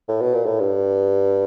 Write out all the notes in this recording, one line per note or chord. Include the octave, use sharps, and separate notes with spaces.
A2
B2
A#2
A2
G2